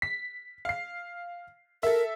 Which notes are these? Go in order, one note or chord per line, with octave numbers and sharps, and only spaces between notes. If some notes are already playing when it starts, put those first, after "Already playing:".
B6
F5 C7
A4 A#4 E5